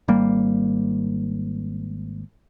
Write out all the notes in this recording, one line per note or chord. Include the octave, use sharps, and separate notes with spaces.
G#1 G3 A#3